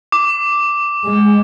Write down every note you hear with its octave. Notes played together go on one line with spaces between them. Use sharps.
D6
G#3